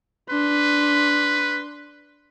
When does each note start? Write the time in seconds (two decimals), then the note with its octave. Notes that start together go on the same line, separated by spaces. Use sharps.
0.30 D4 B4 C6